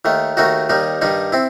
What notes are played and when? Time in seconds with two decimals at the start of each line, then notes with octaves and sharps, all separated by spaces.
0.05 D#2 D#3 A3
0.37 D#2 D#3 A3 D#4 F#4
0.69 D#2 D#3 G3 D#4
1.01 G2 D#3 G3 D#4
1.32 C4 E4